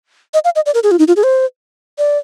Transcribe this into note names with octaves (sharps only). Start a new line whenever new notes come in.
D#5
F5
D#5
D5
A#4
G#4
F4
D#4
F4
G#4
C5
D5